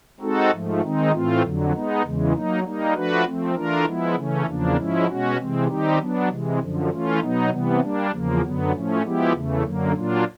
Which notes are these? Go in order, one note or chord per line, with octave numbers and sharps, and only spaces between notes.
G#3 C4 D#4 F#4 A4
G#2 F3 A3
D#3 G#3 C4 D#4
A2 E3 A3 C4 F4
F2 D3 F#3
G#3 B3 D#4
E2 C#3 E3 G#3
F#3 A#3 D#4
G3 A#3 D#4
F3 A3 D4 F#4 B4
F3 A3 C4
E3 A3 D4 F4 A#4
F3 G#3 B3 E4
C#3 E3 A3 C#4
E2 C#3 F3 A#3 D4
G#2 F3 G#3 C#4 E4
B2 G#3 C#4 F#4
C3 E3 G#3 C4
D#3 G3 C4 D#4 G4
F#3 B3 D4
C3 E3 G#3
F#2 D3 F3
E3 A3 C#4 F4
B2 F#3 B3 D#4
C3 E3 G3 B3
G3 A#3 D4
E2 C#3 F3 A#3
F#2 D3 F#3 B3
A2 F3 A3 C#4
F3 G#3 B3 E4 G4
E2 C#3 E3 A3
F#2 D3 F#3 A#3
A#2 F#3 A#3 D4 F4